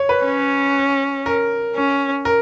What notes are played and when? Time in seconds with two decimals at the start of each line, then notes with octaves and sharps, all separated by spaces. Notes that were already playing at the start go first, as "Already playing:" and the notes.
Already playing: C#5
0.09 B4
0.25 C#4
1.26 A#4
1.76 C#4
2.25 A#4